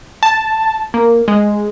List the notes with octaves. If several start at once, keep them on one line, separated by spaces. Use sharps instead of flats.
A5
A#3
G#3